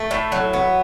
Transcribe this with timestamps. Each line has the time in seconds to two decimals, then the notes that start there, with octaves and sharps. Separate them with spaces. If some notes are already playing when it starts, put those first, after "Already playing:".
Already playing: A3 E5
0.11 A2
0.32 F#3
0.53 B3